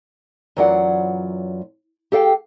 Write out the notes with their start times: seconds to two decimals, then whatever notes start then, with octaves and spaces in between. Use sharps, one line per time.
0.57 F#2 E3 F#3 F4 D5 F#5
2.12 G4 A4 F5 G5